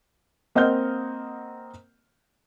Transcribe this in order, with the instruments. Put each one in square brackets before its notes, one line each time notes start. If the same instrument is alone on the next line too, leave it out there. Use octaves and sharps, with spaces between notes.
[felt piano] A#3 C4 D#5 F#5 F6 G6